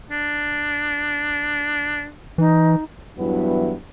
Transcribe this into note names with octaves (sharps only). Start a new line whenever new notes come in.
D4
E3 D#4
E2 G2 E3 F#3 B3 E4